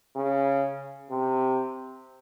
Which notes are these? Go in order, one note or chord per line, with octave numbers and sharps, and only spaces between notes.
C#3
C3